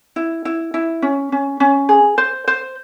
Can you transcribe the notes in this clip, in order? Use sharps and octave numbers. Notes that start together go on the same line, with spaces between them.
E4
E4
E4
C#4
C#4
C#4
G#4
C5
C5